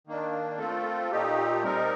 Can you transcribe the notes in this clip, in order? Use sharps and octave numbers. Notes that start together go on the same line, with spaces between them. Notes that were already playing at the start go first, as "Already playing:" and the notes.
D#3 A#3 D4
A3 C4 F4 A4
A#2 A3 D#4 G4
G3 C4 D#4 A#4